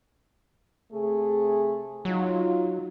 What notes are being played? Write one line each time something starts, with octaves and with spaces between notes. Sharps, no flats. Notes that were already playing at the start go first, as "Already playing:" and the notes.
C3 A3 G#4
F#3 D#4 F4